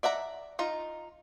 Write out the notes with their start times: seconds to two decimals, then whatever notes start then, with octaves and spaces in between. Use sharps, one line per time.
0.03 D5 E5 F#5 A#5
0.59 D#4 F4